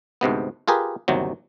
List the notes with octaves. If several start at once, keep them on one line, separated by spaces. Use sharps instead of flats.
D2 G#2 C3 B3
F4 G4 G#4 A#4 B4
G1 D#2 C3 F#3